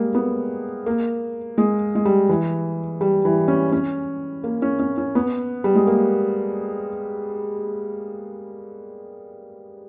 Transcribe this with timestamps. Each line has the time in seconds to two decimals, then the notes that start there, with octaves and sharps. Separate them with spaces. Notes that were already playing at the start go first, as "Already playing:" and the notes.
Already playing: G3 G#3 A#3
0.15 B3
0.86 A#3
1.58 G#3
1.95 G#3
2.05 G3
2.29 E3
3.01 G3
3.25 E3
3.48 C#4
3.72 C#4
4.44 A#3
4.62 C#4
4.79 C#4
4.98 C#4
5.15 B3
5.64 G3
5.75 G#3
5.87 A#3